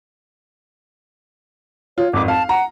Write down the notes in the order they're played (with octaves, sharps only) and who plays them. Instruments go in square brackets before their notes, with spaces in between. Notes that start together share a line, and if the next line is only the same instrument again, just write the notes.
[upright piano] F4 [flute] C#5
[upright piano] G#1 F2 [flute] D6
[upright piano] F5 [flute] A5
[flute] F#5 [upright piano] A#5